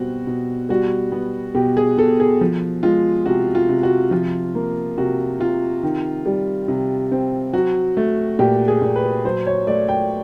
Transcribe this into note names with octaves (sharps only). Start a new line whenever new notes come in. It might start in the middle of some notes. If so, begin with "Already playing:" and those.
Already playing: B2 G3 C4 F#4
B2
G3 F#4
B3
B2 G4
G#4
B2 A4
G#4
F3
G#3 F4
C3 F#4
F4
C3
F#4
F3 F4
A#3
C3 F#4
C3 F4
D#3
G3
C3
C4
F#3 F#4
A3
A#2 G4
G#4
A#2
B4
F#3 C5
C#5
A3 D5
G5